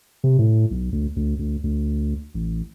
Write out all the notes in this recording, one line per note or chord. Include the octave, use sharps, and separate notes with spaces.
C3
A2
B1
D2
D2
D2
D2
A1